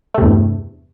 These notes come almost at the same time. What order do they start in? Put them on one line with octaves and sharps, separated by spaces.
A3 C3 E2 G2